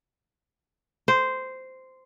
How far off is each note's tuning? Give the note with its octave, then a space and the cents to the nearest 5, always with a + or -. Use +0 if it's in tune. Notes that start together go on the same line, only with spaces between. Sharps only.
C5 -10